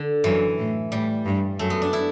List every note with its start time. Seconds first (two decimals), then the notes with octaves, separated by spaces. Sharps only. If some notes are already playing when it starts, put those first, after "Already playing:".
Already playing: D3
0.24 F#2 E3
0.58 A2
0.92 A2 G3
1.26 G2
1.59 F#2 A3
1.70 B3
1.82 D4
1.93 E4